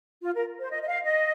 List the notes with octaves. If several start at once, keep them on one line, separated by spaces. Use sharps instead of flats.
F4
A#4
C5
D#5
D#5
F5
D#5